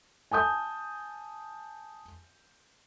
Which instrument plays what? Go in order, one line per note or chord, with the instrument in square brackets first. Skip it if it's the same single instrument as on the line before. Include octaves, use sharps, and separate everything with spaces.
[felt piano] G#5 A5 D#6 G6